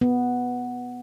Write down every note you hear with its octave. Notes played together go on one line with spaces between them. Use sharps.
B3